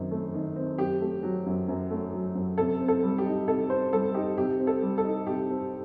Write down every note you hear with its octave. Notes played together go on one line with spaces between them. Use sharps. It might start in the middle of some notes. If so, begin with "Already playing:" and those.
Already playing: F#2 D#3 C4
A3
D#3
C4
F#2 G4
A3
F#3
F#2
F#2
A3
F#3
F#2
C3 A4
C4
A4
G3
G4
D#4
C3 A4
C4 C5
G3 A4
D#4 G4
C3 G4
C4
A4
G3
A4
D#4
C3 G4
C4